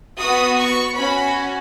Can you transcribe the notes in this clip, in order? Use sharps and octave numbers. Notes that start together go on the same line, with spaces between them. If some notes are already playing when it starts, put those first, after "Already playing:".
B3 F#4 D#6
C#6
C#4 F#4 B5